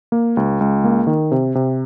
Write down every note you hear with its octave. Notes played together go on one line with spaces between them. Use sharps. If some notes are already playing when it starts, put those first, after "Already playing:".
A#3
C#2
C#2
A#3
D#3
C3
C3